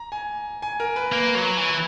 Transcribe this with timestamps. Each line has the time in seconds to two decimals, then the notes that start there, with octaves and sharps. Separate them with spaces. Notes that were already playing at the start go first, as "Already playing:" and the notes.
Already playing: A#5
0.12 G#5
0.62 G#5
0.80 A#4
0.96 B4
1.12 A#3
1.35 F#3
1.57 E3